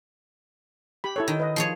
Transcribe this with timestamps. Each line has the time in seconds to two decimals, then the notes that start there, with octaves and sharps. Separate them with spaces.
1.04 G4 B5
1.16 E4 A4 C#5
1.28 D#3
1.40 B4 D#5
1.56 F3 G#4 C#5